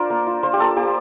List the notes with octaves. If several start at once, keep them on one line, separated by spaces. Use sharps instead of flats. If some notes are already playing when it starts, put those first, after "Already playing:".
Already playing: D4 F4 A#4 C5 D5
A#3
F4
A#3 C5
G4
A#3 A4
A#3 G4